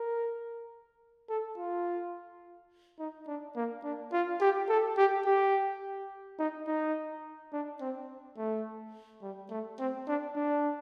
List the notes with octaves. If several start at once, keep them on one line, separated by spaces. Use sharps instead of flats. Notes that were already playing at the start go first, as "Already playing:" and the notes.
Already playing: A#4
A4
F4
D#4
D4
A#3
D4
F4
G4
A4
G4
G4
D#4
D#4
D4
C4
A3
G3
A3
C4
D4
D4